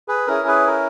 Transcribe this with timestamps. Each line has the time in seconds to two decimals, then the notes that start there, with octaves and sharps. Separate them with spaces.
0.08 G#4 B4
0.27 C#4 E4 G#4 A#4
0.48 G#4 B4
0.67 A#4